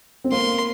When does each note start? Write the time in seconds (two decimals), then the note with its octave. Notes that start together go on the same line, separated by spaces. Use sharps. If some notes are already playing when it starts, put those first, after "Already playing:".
0.24 C4
0.32 A#3 C6